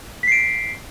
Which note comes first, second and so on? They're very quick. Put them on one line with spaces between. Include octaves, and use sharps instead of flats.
B6 C7 D7